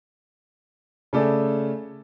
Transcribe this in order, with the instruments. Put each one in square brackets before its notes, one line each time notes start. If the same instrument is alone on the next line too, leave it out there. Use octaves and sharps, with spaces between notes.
[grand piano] C#3 A3 A4 D5 G#5